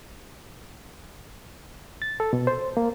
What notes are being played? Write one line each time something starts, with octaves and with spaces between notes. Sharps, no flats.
A6
A4
B2
C5
A#3